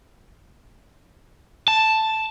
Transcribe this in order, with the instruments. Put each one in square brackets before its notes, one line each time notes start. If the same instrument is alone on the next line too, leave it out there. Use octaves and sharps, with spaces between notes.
[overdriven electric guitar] A5